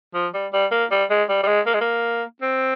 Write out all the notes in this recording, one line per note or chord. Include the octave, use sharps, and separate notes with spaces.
F3
G3
G3
A#3
G3
G#3
G3
G3
G#3
A#3
G#3
A#3
C4